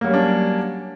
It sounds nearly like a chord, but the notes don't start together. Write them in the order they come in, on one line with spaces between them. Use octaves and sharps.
A#3 F#3 G3 C#4 D4